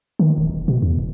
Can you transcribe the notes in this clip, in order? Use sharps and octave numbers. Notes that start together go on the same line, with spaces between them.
D#3
D#1
E1
B2
E2
E1